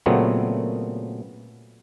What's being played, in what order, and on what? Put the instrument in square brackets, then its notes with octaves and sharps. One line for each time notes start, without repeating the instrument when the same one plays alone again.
[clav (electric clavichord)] A#2 C#3 F#3 A3 B3 C4